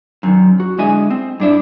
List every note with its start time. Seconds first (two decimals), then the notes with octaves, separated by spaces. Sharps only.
0.23 F#2 D#3
0.60 F#4
0.78 D3 G#3 E4 D#5 E5 G#5
1.10 C4
1.40 G2 D4 E4